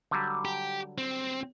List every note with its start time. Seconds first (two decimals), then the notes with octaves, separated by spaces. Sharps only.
0.11 D3 F#3 G3
0.45 G4
0.98 C4